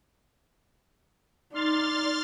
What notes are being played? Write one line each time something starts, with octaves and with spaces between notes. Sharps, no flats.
D#4 D5 C6 F6 A6